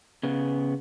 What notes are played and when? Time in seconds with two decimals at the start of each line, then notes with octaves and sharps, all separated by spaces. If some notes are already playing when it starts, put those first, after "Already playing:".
0.23 C#3 B3